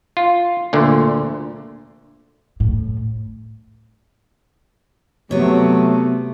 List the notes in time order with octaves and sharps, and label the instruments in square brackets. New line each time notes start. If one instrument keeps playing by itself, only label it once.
[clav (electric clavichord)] F4
D2 A#2 D3
[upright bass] A2
[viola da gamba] C3 [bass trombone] F#3 [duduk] A3 [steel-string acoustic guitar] B3 C#5